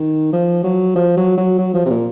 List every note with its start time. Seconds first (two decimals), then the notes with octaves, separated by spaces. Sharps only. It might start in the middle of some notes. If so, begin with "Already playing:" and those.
Already playing: D#3
0.33 F3
0.64 F#3
0.96 F3
1.17 F#3
1.37 F#3
1.58 F#3
1.74 F3
1.86 C3
1.90 A#2